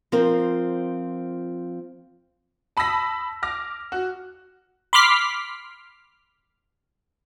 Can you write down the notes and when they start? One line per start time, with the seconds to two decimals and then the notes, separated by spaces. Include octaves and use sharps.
0.12 F3 C4 F4 A#4 C5
2.77 A5 B5 D#6 E6 A#6 B6
3.43 D6 F6 A#6
3.92 F#4
4.93 B5 C6 D6 F6 B6